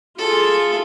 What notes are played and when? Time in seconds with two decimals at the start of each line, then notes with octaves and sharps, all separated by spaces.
0.18 F4 G#4 A4